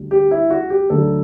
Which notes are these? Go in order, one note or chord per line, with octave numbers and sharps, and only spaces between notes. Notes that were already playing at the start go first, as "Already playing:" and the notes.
Already playing: D2 D3 G3
G4
E4
F#4
G4
D2 D3 F#3 A4